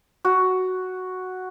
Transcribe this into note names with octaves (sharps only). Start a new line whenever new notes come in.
F#4